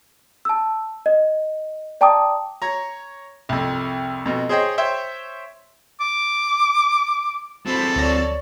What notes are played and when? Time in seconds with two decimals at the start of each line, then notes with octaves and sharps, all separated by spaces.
0.45 A5 E6
1.06 D#5
2.01 D5 G5 A5 A#5 D6 D#6
2.62 C#5 A#5
3.49 C2 F2
4.26 F2 B2
4.49 G#4 C5 C#5 D#5 G5
4.78 C5 C#5 E5 G5
6.01 D6
7.66 F#3 C4 A4 C5 B5
7.96 D2 C#5 D5 A#6